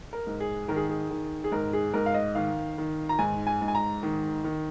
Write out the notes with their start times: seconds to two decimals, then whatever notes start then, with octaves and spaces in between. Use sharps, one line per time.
0.13 A#4
0.27 G#2
0.40 G#4
0.68 D#3 A#4
0.76 G#4
0.89 G#4
1.11 D#3
1.44 G#4
1.52 G#2 A#4
1.73 G#4
1.94 G#2 A#4
2.06 F5
2.14 D#5
2.35 D#3 F5
2.78 D#3
3.09 A#5
3.19 G#2 G#5
3.47 G#5
3.62 G#2
3.68 G#5
3.75 A#5
4.03 D#3
4.44 D#3